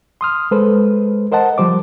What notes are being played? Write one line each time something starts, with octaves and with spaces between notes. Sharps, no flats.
C6 D#6 F6
G#3 A4 B4 C5
A#4 C5 D#5 F#5 A5
F3 G3 C5 D6